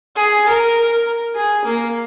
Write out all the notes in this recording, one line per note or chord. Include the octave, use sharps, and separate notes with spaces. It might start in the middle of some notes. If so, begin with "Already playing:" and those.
G#4
A#4
G#4
A#3